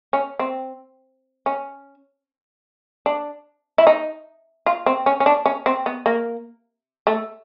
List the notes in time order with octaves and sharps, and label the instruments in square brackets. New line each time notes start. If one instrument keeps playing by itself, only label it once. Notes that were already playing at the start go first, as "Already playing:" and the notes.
[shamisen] C#4
C4
C#4
D4
E4
D#4
F4
C4
C#4
C#4
D4
C#4
C4
B3
A#3
A3